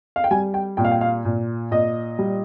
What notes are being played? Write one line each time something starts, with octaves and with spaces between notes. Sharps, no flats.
F5
G5
G3 G#5
G5
A#2 G5
F5
G5
F5
A#2
A#2 D#5
G3